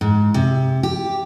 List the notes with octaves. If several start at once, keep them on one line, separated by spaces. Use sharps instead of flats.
G#2
C3
G4